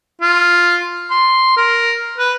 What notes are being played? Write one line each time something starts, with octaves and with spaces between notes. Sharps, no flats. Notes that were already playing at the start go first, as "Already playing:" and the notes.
F4
C6
A#4
B4